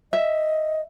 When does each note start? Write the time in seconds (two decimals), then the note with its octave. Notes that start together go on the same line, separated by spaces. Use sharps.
0.13 D#5 E5